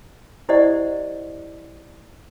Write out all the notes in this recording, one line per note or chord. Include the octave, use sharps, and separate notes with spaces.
E4 G4 C5 D5 D#5 F#5